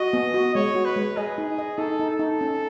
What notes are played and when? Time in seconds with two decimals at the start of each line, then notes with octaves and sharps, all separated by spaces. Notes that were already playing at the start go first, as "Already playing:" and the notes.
Already playing: F#4 D#5
0.13 B3
0.34 F#4
0.55 G#3 C#5
0.75 F#4
0.85 B4
0.96 G#3
1.17 G#4 D#5
1.38 D#4
1.58 D#5
1.78 D#4 A4
1.99 D#4
2.10 A4
2.19 D#4
2.41 C#4